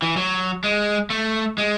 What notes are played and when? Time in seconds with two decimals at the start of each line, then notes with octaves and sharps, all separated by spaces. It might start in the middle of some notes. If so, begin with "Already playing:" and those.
0.02 E3
0.17 F#3
0.64 G#3
1.10 A3
1.58 G#3